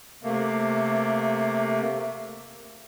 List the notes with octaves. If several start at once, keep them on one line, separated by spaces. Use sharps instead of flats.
C3 A3 A#3